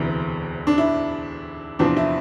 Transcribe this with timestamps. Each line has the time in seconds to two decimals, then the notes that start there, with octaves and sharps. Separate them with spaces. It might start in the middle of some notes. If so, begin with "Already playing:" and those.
Already playing: E1 D2 C3 E3
0.67 D4
0.78 E4
1.79 E2 C3 F3 C4 D4
1.97 E4